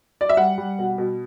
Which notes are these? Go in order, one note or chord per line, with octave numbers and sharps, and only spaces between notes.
D5
E5
G3 F#5
G3
B2
B2